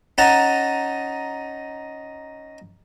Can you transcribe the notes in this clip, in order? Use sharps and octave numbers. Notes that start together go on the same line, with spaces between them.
C#4 D#4 F#5 A5 A#5